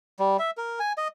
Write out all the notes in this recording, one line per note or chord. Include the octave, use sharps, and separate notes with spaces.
G3
E5
A#4
G#5
D#5